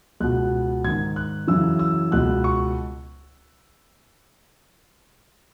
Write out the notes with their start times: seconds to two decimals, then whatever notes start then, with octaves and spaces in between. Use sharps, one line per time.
0.20 C#2 B2 F#6
0.84 G#2 D#3 G#6
1.16 F#6
1.47 F#2 C#3 E3 E6
1.79 E6
2.11 C#2 B2 F#6
2.44 C#6